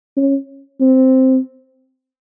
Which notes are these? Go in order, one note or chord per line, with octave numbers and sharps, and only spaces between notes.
C#4
C4